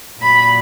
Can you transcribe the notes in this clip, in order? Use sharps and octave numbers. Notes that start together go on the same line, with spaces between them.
A#2 F#3 B5